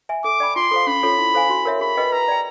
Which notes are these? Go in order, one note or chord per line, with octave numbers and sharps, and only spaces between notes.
E5 G#5
A4 D6
D5 G5 B5
F4 C6
A4 C5 F5
C#4 B5
F4 A4 C#5
E4
A4 C5 F5 G#5
F#4
A#4 C#5 E5
G#4 B5
B4 D#5 G5
B4 A#5
D5 G5